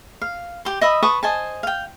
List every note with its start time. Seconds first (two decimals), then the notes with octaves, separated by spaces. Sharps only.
0.22 F5
0.65 G4 C6
0.81 D#5 E5 B5 D#6
1.03 B4 A5 C#6 D#6
1.23 C5 D#5 G#5 A5
1.63 F5 G5